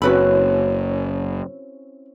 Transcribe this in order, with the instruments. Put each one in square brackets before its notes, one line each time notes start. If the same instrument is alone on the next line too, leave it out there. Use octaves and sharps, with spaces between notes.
[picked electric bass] F#1 [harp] C4 C#4 E4 [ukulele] F#4 B4 B5